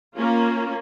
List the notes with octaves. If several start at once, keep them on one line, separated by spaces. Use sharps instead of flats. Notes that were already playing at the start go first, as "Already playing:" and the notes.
A#3 C#4 F4